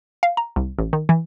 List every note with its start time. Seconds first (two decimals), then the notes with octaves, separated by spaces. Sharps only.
0.23 F5
0.37 A#5
0.56 C2
0.79 A1
0.93 D#3
1.09 E3